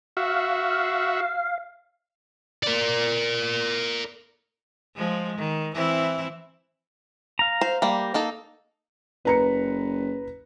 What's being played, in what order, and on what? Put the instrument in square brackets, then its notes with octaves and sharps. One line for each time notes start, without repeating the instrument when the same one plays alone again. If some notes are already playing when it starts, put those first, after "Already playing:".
[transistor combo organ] F#4 E5 [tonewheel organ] F5
[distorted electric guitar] A#4 D5
[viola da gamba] F3 G#3
D#3
E3 C4 E4
[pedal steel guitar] F5 A#5
[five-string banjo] C5
G3 A#3
A#3 D#4 A4
[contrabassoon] F#1 [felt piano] B4 A#5 C#7